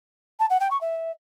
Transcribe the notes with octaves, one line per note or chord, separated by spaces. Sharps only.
A5
F#5
G5
C#6
E5